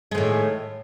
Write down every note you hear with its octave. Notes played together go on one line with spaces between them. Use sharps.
A2 D#3 G#3